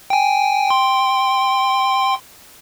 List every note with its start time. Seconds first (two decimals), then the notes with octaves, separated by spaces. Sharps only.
0.10 G5 G#5
0.69 G5 C6